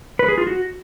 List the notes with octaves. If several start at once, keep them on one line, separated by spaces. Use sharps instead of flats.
B4
G#4
F4
F#4